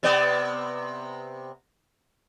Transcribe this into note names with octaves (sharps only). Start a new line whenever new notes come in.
C3 B3 D5